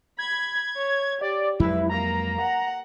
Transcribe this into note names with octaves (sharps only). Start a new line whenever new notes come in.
B5 G#6
C#5
G4 D5
F2 F#3 G#3 E4 B4
A#3 A#5
F#5